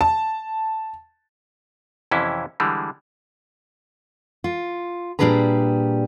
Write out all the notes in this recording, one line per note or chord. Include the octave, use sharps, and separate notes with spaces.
A5
F2 C3 E3 C#4 E4
D3 E3 G3 G#3
F4
A#2 G3 D4 G#4 B4 A#5